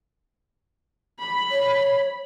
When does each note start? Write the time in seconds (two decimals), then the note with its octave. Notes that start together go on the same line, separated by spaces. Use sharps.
1.19 B5
1.51 C#5